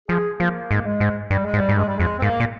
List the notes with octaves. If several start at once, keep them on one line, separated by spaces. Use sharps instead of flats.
F3 G#4
F3 A#3
G#2 A#3
G#3
G#2
G2 G3
G#3
G#2
G3
G#2
G2 G#3
G3
F2 G#3
C4
G#2 A#3
A#2